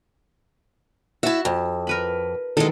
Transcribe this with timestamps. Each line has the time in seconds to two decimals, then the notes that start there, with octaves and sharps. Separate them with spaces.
1.23 E4 F#4 E5 A5
1.45 F2
1.87 A#4 B4 B5
2.57 D#3 E3 F#3 G#3 A4